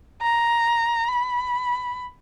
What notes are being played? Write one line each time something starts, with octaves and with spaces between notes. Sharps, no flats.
A#5
B5